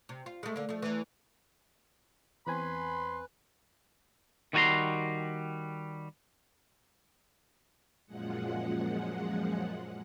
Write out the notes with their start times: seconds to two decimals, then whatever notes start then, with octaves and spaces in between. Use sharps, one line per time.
0.09 C3
0.26 F4
0.43 G#3 A3
0.56 D3 A#3
0.69 F3 A3
0.82 E2 E3
2.47 E2 C4 B4 G#5 B5 C6
4.53 D#3 G3 F#4 G#5 A#5 C6
8.06 F#2 A#2 F3 G#3 F#5